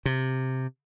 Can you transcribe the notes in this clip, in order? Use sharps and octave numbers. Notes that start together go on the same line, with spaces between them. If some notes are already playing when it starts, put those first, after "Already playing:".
C3